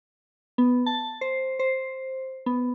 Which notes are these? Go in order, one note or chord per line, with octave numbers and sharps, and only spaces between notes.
B3
A5
C5
C5
B3